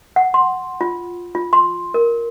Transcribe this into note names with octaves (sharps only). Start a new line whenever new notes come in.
F#5
C6
F4
F4
C6
A#4